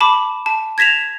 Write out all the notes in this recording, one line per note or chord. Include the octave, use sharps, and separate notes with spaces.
A5 B5 D6
A5
G#6 A#6 B6 E7 F7